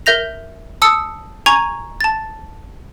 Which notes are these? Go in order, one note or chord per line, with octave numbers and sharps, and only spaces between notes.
A#4 E5 G6 A#6 F7
A5 D#6 E6 C#7
G#5 A#5 C#6 G#6 D#7 F7
A5 A6